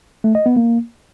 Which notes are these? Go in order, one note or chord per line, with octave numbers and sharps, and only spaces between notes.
A3
D#5
B3
A#3